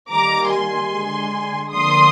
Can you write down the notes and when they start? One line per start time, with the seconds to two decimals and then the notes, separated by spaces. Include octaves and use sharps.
0.10 D#3 G3 A#3 A#5 D6
0.51 G#5 C6
0.91 D3 G#3
1.71 D3 F3 A#3 C6 D#6